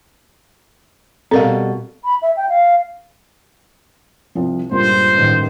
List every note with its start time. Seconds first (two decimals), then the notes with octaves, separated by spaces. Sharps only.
1.31 B2 G3 C4 A4 A#4 F5
2.04 B5
2.22 E5
2.37 G5
2.49 F5
4.35 C2 F3
4.71 C#2 G2 A#2 C5
5.14 A1 D#3